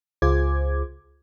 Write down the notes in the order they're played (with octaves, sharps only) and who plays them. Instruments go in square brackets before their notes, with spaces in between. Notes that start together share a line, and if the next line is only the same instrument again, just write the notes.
[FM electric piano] C#2 F4 G#4 C5 D6 G#6